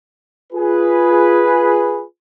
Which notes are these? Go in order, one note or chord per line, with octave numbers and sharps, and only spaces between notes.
F4 G#4 B4